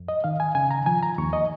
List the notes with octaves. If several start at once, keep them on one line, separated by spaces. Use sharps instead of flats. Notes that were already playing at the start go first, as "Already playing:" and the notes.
Already playing: F2
D#5
D#3 F5
G#5
C#3 G#5
A#5
F3 G#5
A#5
D#2 C#6
D#5